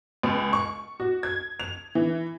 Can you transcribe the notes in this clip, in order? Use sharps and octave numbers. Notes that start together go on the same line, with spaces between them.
C#2
C#6
F#4
G#6
F7
E3